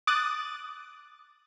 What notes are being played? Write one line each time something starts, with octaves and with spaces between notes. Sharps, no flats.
D6 D#6 F#6 A6